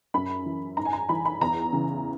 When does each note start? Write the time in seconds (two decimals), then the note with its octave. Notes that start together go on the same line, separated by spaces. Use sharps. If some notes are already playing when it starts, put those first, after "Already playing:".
0.14 F#2 B5
0.46 E3
0.77 G#2 A#5
0.85 G#5
0.93 A#5
1.09 E3 B5
1.25 B5
1.41 E2 A#5
1.73 C#3 E3